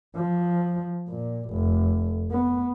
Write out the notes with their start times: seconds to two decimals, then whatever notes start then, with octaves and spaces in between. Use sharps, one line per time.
0.16 F3
1.09 A#2
1.50 F1
2.31 B3